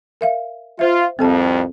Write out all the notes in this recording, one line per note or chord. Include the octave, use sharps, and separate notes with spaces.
A#4 E5 F5
F4 C5 E5
C2 F2 C4 A4 A5